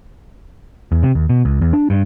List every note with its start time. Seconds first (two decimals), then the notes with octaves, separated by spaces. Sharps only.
0.92 E2
1.03 C3
1.15 D#2
1.29 B2
1.45 C#2
1.61 E2
1.73 D4
1.90 G2